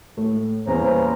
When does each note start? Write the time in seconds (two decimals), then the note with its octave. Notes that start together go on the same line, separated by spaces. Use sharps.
0.17 A2 A3
0.67 E2 G2 A#2 B3 C#4 B4 C5 A#5